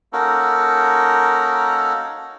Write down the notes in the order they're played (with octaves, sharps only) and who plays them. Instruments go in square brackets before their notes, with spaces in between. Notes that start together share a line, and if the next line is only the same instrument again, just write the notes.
[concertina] A#3 C#4 D#4 F#4 A4 A#4